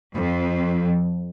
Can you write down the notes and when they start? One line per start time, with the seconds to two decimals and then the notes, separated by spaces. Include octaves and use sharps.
0.15 F2